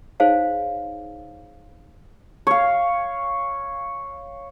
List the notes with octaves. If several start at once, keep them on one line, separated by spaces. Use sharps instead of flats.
D#4 G#4 C5 C#5 F5 A5
C#5 F5